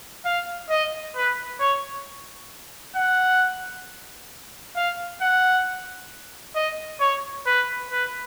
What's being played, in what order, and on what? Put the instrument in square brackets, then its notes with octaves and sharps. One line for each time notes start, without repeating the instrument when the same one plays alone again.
[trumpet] F5
D#5
B4
C#5
F#5
F5
F#5
D#5
C#5
B4
B4